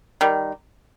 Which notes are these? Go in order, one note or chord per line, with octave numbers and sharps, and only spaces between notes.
D#3 G3